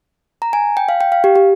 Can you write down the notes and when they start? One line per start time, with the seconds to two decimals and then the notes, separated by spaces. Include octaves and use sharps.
0.42 A#5
0.53 G#5
0.77 G5
0.89 F5
1.01 G5
1.12 F5
1.24 G4
1.35 G4